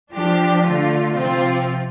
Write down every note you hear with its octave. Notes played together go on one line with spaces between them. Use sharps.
F3 D4 G4
D3 A3 F4
C3 F3 C4 F4